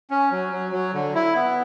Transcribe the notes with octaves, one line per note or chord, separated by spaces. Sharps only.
C#4
F#3
F#3
F#3
D3
E4
B3